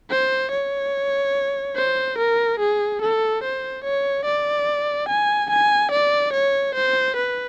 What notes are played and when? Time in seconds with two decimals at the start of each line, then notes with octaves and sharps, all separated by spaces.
0.11 C5
0.51 C#5
1.76 C5
2.18 A#4
2.59 G#4
3.02 A4
3.43 C5
3.84 C#5
4.25 D5
5.08 G#5
5.50 G#5
5.91 D5
6.33 C#5
6.75 C5
7.16 B4